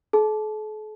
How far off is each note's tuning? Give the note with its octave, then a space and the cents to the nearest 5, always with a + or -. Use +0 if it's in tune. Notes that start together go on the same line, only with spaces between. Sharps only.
A4 -45 A5 -25